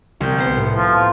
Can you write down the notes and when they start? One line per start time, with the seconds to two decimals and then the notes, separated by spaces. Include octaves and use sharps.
0.20 C2 G6
0.38 B3 C5
0.57 A2
0.76 F3
0.95 F4